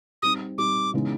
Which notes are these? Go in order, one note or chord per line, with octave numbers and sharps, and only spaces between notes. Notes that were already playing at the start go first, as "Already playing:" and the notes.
G3 C4 D#4 D#6
G3 C4 D#4 D6
C#3 E3 G#3 B3 D#4